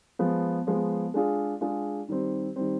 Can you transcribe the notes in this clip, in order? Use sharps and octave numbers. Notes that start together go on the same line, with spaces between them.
F3 G#3 B3
F3 G#3 B3
G#3 D4 F4 G#4
G#3 D4 F4 G#4
D#3 G3 C4
D#3 G3 C4